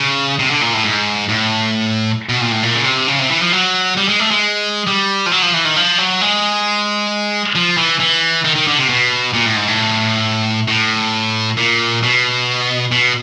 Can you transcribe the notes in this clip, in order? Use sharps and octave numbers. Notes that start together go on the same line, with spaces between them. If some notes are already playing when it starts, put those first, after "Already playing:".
Already playing: C#3
C3
D3
A#2
A2
G#2
A2
B2
A#2
A2
A#2
C#3
C3
C#3
C3
E3
F3
F#3
G3
G#3
A3
G#3
G3
F3
F#3
F3
E3
D#3
F3
F#3
G#3
F3
E3
E3
D#3
D#3
D3
C3
B2
A#2
A2
G#2
A2
A2
A#2
B2
B2